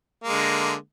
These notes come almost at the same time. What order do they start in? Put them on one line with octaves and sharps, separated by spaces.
A#3 G#3 D3